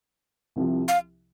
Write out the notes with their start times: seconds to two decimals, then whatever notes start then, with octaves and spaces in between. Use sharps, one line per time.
0.56 C2 C3 F3
0.88 F5